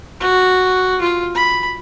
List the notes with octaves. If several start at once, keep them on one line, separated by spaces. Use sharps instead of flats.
F#4
F4
B5